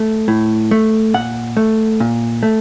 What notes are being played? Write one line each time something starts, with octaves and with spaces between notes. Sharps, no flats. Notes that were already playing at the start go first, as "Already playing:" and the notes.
Already playing: A3
A2
A3
A#2 F#5
A3
A#2
A3